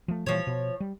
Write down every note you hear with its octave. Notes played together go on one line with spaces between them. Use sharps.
F3 A3
A#2 E3 F3 G3 C#5
B2
G3